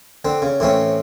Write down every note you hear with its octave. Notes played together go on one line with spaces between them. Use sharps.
D3 C4
C#3
A2 E3 C4 C#4